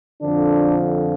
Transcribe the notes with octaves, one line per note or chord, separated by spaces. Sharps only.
F2 D3 F3 D4